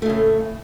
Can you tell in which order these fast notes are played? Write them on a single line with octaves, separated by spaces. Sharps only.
A3 C#3 A2